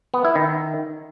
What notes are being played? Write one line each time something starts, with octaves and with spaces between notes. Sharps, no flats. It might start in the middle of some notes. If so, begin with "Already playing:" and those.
B3
E4
D#3